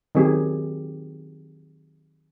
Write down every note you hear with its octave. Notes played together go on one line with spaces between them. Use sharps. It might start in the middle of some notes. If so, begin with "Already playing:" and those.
D#3 F#3 C4 G4 G#4